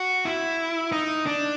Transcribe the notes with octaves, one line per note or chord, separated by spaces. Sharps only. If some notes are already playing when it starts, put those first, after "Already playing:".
Already playing: F#4
E4
D#4
D4